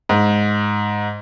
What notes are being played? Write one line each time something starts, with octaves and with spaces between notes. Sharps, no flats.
G#2